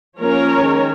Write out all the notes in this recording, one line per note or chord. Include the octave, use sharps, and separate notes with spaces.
F3 A#3 C#4 A#4 C#5
D#3 G#3